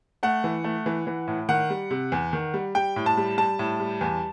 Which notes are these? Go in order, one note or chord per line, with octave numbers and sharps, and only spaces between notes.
A3 F#5
E3
A3
E3
E3
A2
D#3 F#5
G3
C3
E2
D#3
G3
G3 G5
A2
A5
G3
G3 A5
A2
G3
E2